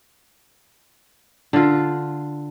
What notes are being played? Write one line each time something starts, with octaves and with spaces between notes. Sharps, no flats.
D3 F4